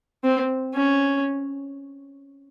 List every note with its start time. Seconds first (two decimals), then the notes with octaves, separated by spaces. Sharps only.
0.24 C4
0.75 C#4